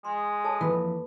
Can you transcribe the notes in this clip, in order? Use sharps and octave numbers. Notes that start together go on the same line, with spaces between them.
G#3 C6
A4 C#5 A5
F2 G#2 E3 A#3 B4 B5